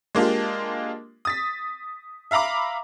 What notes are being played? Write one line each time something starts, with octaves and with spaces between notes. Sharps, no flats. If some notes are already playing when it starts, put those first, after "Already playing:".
G#3 A#3 D4 F4 G4
D#6 A6 B6
E5 F5 A#5 B5 D6